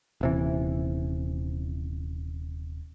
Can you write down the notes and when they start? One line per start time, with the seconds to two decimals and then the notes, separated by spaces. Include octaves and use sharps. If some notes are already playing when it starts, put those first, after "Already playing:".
0.21 D#1 C3 E3